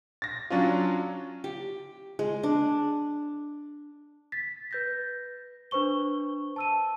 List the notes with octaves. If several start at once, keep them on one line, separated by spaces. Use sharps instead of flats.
A6 A#6
F#3 C#4 D4 F4
G4
G#3
D4
A6 B6
B4 G6 A#6
D4 B4 C5 C#6 G7
A5 E6 D#7